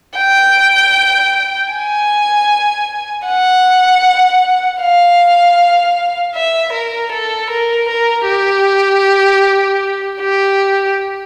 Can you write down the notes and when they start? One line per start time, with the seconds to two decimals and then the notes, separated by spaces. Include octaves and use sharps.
0.18 G5
1.71 G#5
3.26 F#5
4.80 F5
6.34 E5
6.73 A#4
7.12 A4
7.50 A#4
7.89 A#4
8.27 G4
10.20 G4